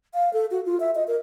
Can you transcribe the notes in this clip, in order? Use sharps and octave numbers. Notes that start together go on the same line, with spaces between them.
F5
A4
F#4
F4
E5
D#5
A#4